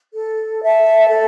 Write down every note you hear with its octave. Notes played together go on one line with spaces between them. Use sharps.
A4
E5 A5
A4